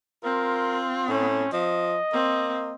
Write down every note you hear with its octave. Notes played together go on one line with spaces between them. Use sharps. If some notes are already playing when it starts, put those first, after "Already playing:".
C4 F4 A#4
A2 C#4
F3 D#5
A#3 C4